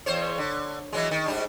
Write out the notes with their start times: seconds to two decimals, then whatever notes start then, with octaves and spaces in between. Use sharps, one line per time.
0.06 E2 C5 C#5
0.38 D3
0.93 E3 F#3 G#3
1.11 D#3
1.26 G#2 G3 D4